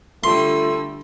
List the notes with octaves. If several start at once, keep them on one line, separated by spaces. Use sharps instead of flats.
D3 G3 A3 F4 C6 E6